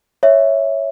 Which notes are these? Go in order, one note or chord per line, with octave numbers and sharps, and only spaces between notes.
C#5 E5